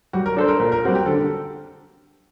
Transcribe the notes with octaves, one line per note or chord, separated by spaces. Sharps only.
G3 F#4
A#4
D4 A4 C5
A#4
A#2 A#4
A#4
G3 C4 F#4 A#4
G4
D3 A4